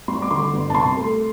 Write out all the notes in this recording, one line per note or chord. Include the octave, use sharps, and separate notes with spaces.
G3 C6
D6
D3 C6
G1
A5
C2 C6
A3